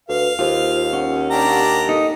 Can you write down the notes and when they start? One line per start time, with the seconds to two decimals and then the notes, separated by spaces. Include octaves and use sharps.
0.09 D2 B4 F5
0.39 D#2 F4 C5
0.93 C#4 F#5
1.31 D4 G4 A#5
1.89 D#4 A4